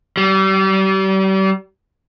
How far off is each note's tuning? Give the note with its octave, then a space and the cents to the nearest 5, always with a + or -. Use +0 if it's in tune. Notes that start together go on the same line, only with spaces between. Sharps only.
G3 -35